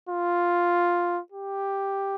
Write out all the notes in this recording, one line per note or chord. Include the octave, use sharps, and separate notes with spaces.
F4
G4